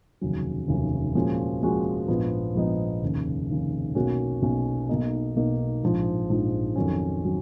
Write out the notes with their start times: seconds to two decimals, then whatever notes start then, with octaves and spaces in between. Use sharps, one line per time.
0.21 F1 D#2 C#3 F#3 C#4
0.68 F1 D#2 C#3 F#3 C#4
1.15 A#2 F3 G#3 C#4 F#4
1.62 A#2 F3 G#3 C#4 F#4
2.08 A#1 G#2 F3 B3 D#4
2.55 A#1 G#2 F3 B3 D#4
3.02 F1 D#2 C#3
3.49 F1 D#2 C#3
3.95 B1 B2 A#3 C#4 F#4
4.42 B1 B2 A#3 C#4 F#4
4.89 B1 B2 A#3 D#4
5.35 B1 B2 A#3 D#4
5.83 A#1 G#2 F3
6.29 A#1 G#2 F3
6.76 F2 D#3 F#3 C#4
7.23 D#3 F#3 C#4